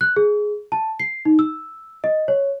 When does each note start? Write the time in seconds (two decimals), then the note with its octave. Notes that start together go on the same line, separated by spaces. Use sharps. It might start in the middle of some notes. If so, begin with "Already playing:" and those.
0.01 F#6
0.16 G#4
0.72 A5
1.00 C7
1.25 D#4
1.39 E6
2.04 D#5
2.28 C#5